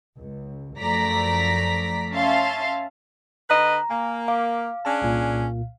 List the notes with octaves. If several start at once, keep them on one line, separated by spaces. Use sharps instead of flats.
C#2
F#2 F3 A3 D5 A#5 B6
C#4 E5 F5 A5 C6
D3 B4 D#5 A#5
A#3 F5 G#5
F5 D6
C#4 D4 G#4 A5
C2 A#2